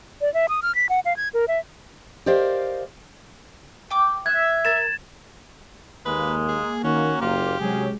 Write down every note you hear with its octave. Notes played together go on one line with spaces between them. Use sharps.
D5
E5
D#6
F6
B6
F#5
F5
G#6
A#4
E5
G4 A#4 C5 D5 D#5 F5
G5 D6
E5 F#6 G#6
A#4 A6 E7
D#2 G#3 A#3 B4
G#4
D#3 C#4 F#4
F#1 F4 G4
C3 F#3 G#3 C#4 G#4